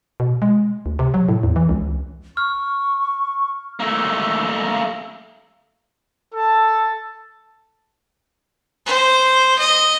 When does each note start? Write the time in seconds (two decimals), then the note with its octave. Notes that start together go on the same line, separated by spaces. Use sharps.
0.20 B2
0.42 G#3
0.86 D2
0.99 C3
1.14 F#3
1.29 A2
1.43 E2
1.56 E3
1.69 C#2
2.37 C#6 F6
3.80 A3 A#3
6.34 A4 A5
8.86 C5
9.59 D#5